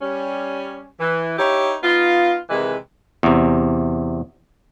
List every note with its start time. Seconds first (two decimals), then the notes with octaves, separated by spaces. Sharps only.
0.01 G3 C#4
1.00 E3
1.38 D#4 E4 G4 C#5
1.83 B3 D#4 F4
2.49 C3 D#3 E3 G#3 B4
3.23 E2 C3